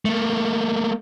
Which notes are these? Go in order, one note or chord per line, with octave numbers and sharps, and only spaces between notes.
A3 A#3